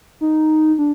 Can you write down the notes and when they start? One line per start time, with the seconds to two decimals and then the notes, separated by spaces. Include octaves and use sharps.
0.21 D#4
0.79 D4